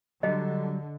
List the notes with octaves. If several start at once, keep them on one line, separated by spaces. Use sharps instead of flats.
D3 F#3 G3 D#5